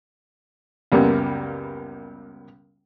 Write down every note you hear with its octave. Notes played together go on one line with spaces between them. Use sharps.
C#2 F#2 G3 A#3 B3